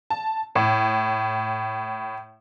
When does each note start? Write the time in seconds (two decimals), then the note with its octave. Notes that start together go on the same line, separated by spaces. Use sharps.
0.10 A5
0.55 A2